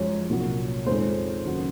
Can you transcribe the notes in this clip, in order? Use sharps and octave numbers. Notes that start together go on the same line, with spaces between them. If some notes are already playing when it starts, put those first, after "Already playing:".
Already playing: F#2 F3 G#3 C#5
C2 A#2 F#3
F2 D#3 G#3 C5
D#2 C#3 F#3